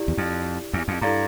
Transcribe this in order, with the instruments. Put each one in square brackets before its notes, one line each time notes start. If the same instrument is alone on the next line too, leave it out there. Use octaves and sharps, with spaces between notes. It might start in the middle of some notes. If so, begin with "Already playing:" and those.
Already playing: [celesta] E4 G4 D5
[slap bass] E2
F2
E2
F2
[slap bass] G2 [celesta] E4 A4 D5 F5 A#5